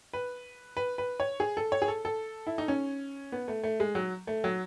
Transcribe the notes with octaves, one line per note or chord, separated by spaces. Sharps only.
B4
B4
B4
C#5
G#4
A4
C#5
G#4
A4
A4
E4
D#4
C#4
B3
A3
A3
G#3
F#3
A3
F#3